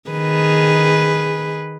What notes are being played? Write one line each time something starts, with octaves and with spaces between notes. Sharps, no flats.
D#3 G#4 B4